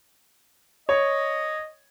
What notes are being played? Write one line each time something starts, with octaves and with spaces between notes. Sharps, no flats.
C#5 D#5